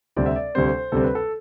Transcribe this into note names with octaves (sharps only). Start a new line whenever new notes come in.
D2 C3 G3 C4 D5
E5
D5
D2 C3 G3 C4 C5
D2 C3 G3 C4 A4
B4
A4